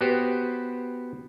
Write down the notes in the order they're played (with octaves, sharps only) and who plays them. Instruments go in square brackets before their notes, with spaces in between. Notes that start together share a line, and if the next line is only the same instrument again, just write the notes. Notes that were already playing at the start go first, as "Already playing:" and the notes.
[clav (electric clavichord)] B3 F#4 G4 B4 C5